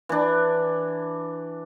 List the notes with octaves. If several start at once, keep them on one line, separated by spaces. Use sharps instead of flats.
E3 D4